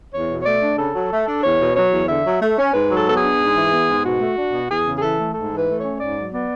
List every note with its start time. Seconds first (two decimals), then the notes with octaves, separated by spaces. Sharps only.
0.13 E2 C#5
0.29 B2
0.41 C#5
0.45 A3 D5
0.62 D4
0.78 C#3 A4
0.95 F#3
1.11 A3
1.27 D4
1.43 E2 C#5
1.60 B2
1.76 F#3 C#5
1.92 E2
2.08 D3 E5
2.25 F#3
2.42 A3
2.58 C#4
2.73 G#2 B4
2.91 F#3
2.96 A4
3.07 B3 A4
3.17 G#4
3.22 D4
3.39 G#2
3.55 E3
3.72 B3
3.88 G#2
4.04 B2 F#4
4.20 A3
4.37 D4
4.53 B2
4.70 E2 G#4
4.85 C#3
4.97 G#4
5.02 E3 A4
5.18 A3
5.34 G#2 A4
5.50 E3
5.57 B4
5.67 A3
5.79 C#4 C#5
6.00 G#2 D5
6.17 F#3
6.33 B3 D5